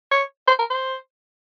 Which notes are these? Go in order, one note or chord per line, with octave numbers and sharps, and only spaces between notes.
C#5
C5
A#4
C5